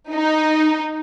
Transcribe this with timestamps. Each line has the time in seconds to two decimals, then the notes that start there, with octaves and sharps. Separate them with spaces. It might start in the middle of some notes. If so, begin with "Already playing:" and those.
0.11 D#4